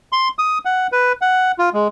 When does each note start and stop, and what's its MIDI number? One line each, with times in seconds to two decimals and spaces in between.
0.12 0.29 84
0.39 0.58 87
0.65 0.87 78
0.92 1.13 71
1.22 1.52 78
1.59 1.69 65
1.74 1.88 56